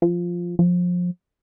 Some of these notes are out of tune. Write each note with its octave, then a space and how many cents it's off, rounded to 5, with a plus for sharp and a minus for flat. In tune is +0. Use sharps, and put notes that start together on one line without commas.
F3 +0
F3 +25